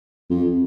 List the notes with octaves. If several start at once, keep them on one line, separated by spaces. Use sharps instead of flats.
F2